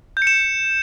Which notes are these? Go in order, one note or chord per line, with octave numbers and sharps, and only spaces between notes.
G6
C#7
E7